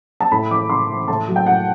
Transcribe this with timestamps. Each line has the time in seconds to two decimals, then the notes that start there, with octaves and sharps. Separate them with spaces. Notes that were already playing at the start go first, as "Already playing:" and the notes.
0.20 A5
0.32 A2 B5
0.51 E3 D6
0.69 A2 C6
0.89 E3
1.08 A2 A5
1.28 F#3
1.36 G5
1.46 A2 F#5